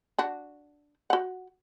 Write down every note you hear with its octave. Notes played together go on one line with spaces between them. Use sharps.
D4 F#4
F#4 F#5